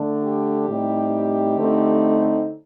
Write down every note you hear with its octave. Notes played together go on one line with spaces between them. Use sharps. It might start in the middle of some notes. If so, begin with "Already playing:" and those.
Already playing: D3 A3 D4
G4
A2 G3 C4 D#4
D3 A3 C4 D#4